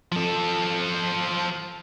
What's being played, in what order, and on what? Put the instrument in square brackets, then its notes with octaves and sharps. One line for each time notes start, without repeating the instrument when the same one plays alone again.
[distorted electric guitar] F3 A4